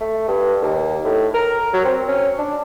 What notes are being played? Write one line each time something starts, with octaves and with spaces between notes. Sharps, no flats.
A3
G2
D#2
A2
A#4
F#3
C4
C#4
D4